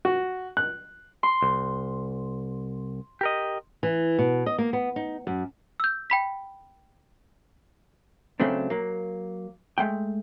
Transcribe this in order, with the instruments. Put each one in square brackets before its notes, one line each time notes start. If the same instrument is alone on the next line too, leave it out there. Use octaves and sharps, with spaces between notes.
[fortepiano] F#4
F#6
[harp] C6
[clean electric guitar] C2
G4 A#4 D#5
[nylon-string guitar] E3
B2
D#5
A#3
B3
D#4
F#2
[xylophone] E6 G6
G5 B5 B6
[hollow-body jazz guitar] C#3 F#3 A3 C4 D4
F#3 A#3
G#3 A3 G5